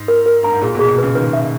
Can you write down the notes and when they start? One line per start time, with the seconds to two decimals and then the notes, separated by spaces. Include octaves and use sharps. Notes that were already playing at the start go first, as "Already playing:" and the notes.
Already playing: G#2
0.08 A#4
0.26 A#4
0.43 G2 A#5
0.52 G#2
0.61 A#2 G#4
0.75 B2 G#4
0.89 B2
0.98 C#3 B4
1.15 D#3 B4
1.33 E5